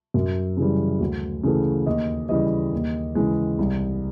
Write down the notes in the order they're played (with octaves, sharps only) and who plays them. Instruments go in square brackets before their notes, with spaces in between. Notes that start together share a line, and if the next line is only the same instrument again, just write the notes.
[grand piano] F#2
C#3 E3 G3
D2
C#3 E3 A3
D#2 D#5
C#3 E3 G3 D#5
D#2
C#3 E3 G#3
C2